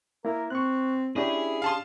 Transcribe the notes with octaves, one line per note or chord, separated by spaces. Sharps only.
A#3 E4 A#4
C4 C#6 F#6
C#4 D4 E4 G4 G#4
F5 A5 C6